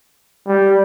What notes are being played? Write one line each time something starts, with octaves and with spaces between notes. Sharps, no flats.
G3